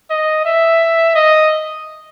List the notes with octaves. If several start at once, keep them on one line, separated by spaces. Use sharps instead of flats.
D#5
E5
D#5